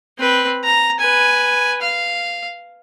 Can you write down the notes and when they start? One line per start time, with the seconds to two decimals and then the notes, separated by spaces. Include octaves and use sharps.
0.19 C4 B4
0.64 A#5
1.00 B4 G#5
1.82 F5